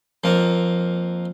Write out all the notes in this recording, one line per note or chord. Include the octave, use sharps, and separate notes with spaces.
F2 A#3